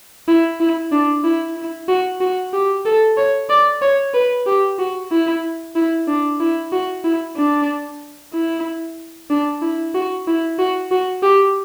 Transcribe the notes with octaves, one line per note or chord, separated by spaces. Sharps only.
E4
E4
D4
E4
E4
F#4
F#4
G4
A4
C#5
D5
C#5
B4
G4
F#4
E4
E4
D4
E4
F#4
E4
D4
E4
D4
E4
F#4
E4
F#4
F#4
G4